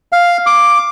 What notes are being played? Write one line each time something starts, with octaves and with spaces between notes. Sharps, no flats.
F5
D6